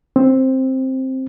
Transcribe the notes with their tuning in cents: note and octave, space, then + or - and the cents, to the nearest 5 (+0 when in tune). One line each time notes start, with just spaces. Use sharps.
C4 +5